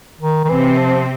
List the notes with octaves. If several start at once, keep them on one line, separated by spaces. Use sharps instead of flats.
D#3
D#3
C3 E3 C4
F3